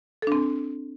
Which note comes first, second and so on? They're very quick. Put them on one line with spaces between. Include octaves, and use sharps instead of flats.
A4 D4 C4